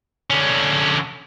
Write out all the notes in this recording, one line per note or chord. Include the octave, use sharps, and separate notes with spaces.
D3 C#4